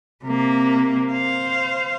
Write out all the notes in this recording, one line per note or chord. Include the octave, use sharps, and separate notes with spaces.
C3 A#3
C5 F5